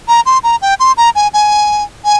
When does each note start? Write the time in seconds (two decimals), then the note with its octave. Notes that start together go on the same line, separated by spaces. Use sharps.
0.08 A#5
0.26 C6
0.44 A#5
0.62 G5
0.80 C6
0.97 A#5
1.15 G#5
1.34 G#5
2.05 G#5